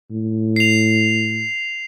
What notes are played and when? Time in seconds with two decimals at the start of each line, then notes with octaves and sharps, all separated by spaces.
0.11 A2
0.56 C7 F7